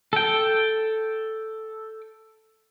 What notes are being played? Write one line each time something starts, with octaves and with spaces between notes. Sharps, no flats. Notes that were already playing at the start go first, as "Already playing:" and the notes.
A4 G5